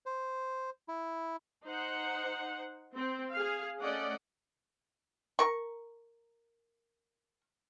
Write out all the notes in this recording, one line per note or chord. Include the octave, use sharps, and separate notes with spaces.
C5
E4
D#4 C5 F#5
C4
G#4 F5
A3 C#4 D5 D#5 F#5
A#4 C#6